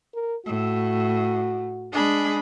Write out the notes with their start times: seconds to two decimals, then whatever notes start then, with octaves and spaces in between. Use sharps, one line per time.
0.15 A#4
0.46 A2 F#4
1.92 G#3 D4 G#4 B5